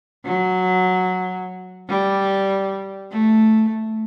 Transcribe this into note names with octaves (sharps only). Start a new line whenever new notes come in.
F#3
G3
A3